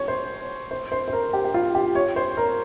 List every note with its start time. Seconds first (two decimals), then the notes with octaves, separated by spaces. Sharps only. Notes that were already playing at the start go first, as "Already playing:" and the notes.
Already playing: C#5
0.08 C5
0.71 C5
0.92 C5
1.08 C5
1.13 A#4
1.33 G4
1.45 G4
1.54 F4
1.75 G4
1.95 C#5
2.16 C5
2.37 A#4